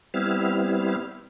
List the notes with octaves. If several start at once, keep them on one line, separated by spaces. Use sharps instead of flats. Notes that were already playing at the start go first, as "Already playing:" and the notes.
G3 B3 C4 E4 F6